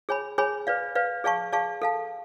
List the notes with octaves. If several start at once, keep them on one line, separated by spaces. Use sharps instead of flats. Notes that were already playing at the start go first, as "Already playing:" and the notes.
G#4 C#5 G#5 B5
G#4 C#5 G#5 B5
B4 D5 F5
B4 D5 F5
G#4 D5 F5 A5 C#6
G#4 D5 F5 A5 C#6
A4 F5 A5